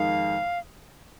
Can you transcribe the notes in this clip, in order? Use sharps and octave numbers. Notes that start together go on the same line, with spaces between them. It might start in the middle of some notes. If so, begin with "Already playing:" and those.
Already playing: F2 D#3 G#3 D#4 F5